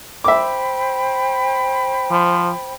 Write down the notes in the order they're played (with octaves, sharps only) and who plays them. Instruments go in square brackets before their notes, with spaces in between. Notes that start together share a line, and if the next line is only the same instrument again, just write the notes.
[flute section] C5 G5 B5 [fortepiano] E5 D6
[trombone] F3